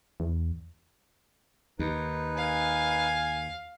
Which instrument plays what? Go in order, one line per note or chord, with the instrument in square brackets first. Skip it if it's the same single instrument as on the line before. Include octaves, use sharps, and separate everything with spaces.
[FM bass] E2
[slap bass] D#2 [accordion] D#4 B4
[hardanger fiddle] F5 [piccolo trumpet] G#5